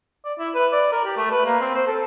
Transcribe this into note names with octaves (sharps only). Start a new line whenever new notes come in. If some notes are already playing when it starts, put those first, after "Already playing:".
D5
E4
B4
D5
A#4
G4
A3
B4
A#3
C4
C5
A4